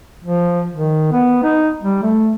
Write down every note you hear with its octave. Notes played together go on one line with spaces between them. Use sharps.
F3
D#3
B3
D#4
G3
A3